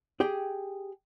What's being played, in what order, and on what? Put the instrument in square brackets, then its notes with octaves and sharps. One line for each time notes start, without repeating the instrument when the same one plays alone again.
[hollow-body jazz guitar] G4 G#4 G5